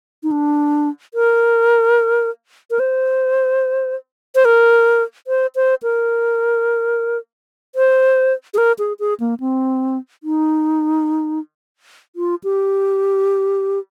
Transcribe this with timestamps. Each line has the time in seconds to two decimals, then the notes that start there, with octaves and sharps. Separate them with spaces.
0.23 D#4
0.31 D4
1.14 A#4
2.71 A#4
2.79 C5
4.35 C5
4.45 A#4
5.27 C5
5.55 C5
5.83 A#4
7.75 C5
8.54 G#4
8.58 A#4
8.79 G#4
8.99 G#4
9.20 A#3
9.40 C4
10.24 D#4
12.16 F4
12.44 G4